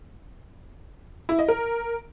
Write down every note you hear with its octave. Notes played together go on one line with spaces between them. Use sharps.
E4
D#5
A#4